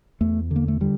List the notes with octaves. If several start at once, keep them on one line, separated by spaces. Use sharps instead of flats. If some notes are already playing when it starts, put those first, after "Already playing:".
E2 A3
D3
A#3
A3
D3 G3